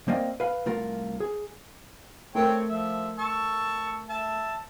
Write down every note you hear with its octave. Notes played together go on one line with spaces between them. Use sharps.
A#3 C4 C5 D5 D#5 F5
B4 F5
C2 A3 F4 A#4
G#4
A3 C4 A#4 C#5 G5
F3 E5
A5 C#6 E6
E5 A5